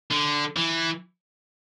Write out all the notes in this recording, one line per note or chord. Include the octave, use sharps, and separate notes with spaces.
D3
E3